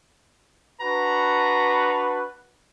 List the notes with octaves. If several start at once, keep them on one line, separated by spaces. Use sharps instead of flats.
D4 F#4 B4 A#5